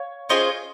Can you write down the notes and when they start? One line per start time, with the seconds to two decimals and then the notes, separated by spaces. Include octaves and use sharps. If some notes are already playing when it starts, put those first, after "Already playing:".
Already playing: C#5 F5
0.29 C#4 F4 G#4 C5 D#5